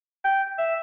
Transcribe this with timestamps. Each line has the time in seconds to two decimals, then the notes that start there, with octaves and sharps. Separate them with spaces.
0.25 G5
0.58 E5